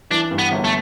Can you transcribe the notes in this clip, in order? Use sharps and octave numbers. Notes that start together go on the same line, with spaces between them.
E3 D4
G2
B3
G1
A3